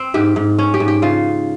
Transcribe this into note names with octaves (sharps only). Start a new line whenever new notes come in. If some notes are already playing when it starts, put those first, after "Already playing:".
Already playing: C4
G#2 G4
G#2
C#4
G4
G#2
G4
C#3 F4